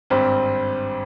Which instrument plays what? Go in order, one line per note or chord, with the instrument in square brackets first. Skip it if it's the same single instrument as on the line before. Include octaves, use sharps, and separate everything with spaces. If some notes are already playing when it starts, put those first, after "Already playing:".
[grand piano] G#1 G2 G3 [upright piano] C4